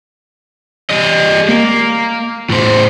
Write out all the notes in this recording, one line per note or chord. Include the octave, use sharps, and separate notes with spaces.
G3 D#5
A#3
A2 C5